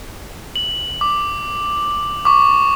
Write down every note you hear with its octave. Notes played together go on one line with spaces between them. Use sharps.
F#7
D6
C#6 D6